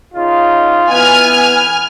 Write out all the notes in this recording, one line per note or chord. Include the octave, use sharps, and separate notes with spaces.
C#3 D#4 F4
E3 B3 G#5 F6